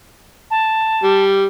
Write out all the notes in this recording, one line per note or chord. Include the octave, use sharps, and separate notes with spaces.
A5
G3